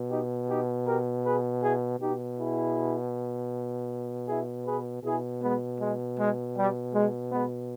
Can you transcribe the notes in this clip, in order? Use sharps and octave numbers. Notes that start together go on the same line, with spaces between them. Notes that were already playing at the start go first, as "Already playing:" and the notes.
Already playing: B2
D#4 G4
D#4 G4
G4 A#4
G#4 B4
E4 G#4
B2 D#4 G4
E4 G#4
E4 G#4
G#4 B4
B2 E4 G#4
G#3 B3
G#3
G#3
G3
G#3
G#3 B3